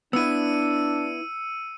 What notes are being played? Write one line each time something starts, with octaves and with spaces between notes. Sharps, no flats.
B3 D4 E4 E6 C#7 D#7